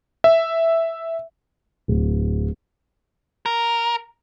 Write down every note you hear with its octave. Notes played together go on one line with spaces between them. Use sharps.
E5
D1
A#4